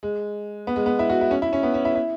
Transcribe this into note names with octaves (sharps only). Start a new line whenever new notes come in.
G#3
B3
G#3
B3
E4
F#4
E4
C#4
E4
C#4
B3
C#4
E4
E4